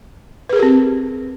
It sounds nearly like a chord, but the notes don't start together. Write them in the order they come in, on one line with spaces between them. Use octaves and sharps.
B4 G#4 A#4 G4 C4